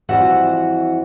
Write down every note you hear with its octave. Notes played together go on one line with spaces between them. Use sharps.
F2 E3 G3 F#4 E5 F#5